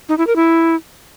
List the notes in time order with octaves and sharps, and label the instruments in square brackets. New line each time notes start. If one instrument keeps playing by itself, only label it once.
[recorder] D#4
E4
A#4
E4